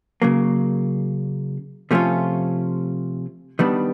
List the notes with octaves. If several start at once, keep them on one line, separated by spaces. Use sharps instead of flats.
C#3 F#3 A#3
C3 F3 A3 C#4 F4
D#3 G3 B3 D4